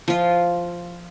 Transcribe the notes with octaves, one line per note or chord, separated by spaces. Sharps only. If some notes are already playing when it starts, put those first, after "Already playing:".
F3 F4